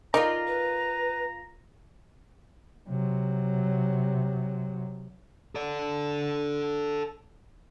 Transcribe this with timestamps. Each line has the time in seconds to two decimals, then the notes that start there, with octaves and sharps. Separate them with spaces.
0.14 D#4 F4 A#4 D5 A#5
0.47 B4
2.88 C3 F#3
5.55 A4 D5